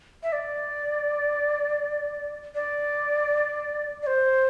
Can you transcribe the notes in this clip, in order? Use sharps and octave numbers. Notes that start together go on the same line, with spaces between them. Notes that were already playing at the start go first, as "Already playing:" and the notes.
E5
D5
D5
D5
C5